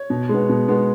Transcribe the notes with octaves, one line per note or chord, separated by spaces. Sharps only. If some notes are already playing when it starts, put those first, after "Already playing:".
Already playing: C#5
B2
G#3 B3
B2
G#3 B3